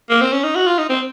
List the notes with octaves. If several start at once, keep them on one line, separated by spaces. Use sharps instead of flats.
A#3
C4
C#4
D#4
F#4
F4
D#4
C4